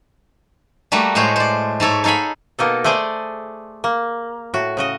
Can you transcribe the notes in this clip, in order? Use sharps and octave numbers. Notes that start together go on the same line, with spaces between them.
G3 A3 A#3 F#4
A2 G#3 A3 C5 C#5
C5 D5
G#2 A3 A4 C#5
D#4 A4 F5 G#5 B5
B2 A#3 D#4 A4
A3 G#4 C5 D5 G#5
A#3
A2 F#4
C#3 F#4 D#5